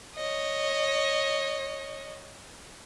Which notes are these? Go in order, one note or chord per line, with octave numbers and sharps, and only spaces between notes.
C#5 D#5